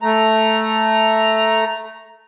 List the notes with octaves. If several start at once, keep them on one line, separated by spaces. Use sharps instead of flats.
A3 A#5